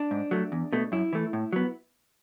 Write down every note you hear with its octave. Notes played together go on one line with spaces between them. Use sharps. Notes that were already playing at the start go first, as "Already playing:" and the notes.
Already playing: D4
G#2
F#3 A3
E2
B2 A3
F#2 E4
E3 A3
A2
F#3 B3